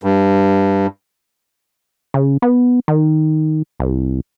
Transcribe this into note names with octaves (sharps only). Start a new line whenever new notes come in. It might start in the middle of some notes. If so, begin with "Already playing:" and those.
G2
C#3
B3
D#3
C2